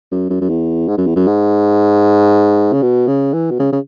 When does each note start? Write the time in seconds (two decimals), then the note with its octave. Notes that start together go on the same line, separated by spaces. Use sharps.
0.11 F#2
0.30 F#2
0.41 F#2
0.49 E2
0.88 G#2
0.98 F#2
1.06 E2
1.16 F#2
1.27 G#2
2.73 C#3
2.82 B2
3.08 C#3
3.34 E3
3.51 B2
3.59 C#3
3.72 C#3